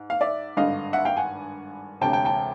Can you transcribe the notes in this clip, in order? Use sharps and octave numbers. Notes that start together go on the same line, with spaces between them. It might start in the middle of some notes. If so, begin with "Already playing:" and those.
Already playing: G#2
F5
D5 E5
G#1 G2 D3 D#5 F5
E5 F#5
F5 G5
F#5 G#5
E1 D2 C3 G5 A5
G5 A5
G5 A5